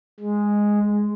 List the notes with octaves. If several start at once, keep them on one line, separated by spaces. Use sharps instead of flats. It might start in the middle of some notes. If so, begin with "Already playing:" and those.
G#3